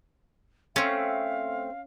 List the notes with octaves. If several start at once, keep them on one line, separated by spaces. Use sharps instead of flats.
A3 C4 C#4 F5